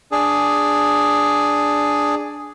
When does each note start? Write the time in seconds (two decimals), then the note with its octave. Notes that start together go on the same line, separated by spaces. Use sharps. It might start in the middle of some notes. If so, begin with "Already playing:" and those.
0.12 D4 G#4